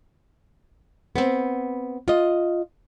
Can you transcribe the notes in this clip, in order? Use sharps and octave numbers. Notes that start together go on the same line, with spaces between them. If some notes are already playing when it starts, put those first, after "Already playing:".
B3 C4
F4 D#5